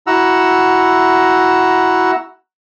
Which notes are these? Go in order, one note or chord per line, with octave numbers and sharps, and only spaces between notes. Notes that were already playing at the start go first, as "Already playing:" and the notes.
E4 F#4 F#5 A#5 E6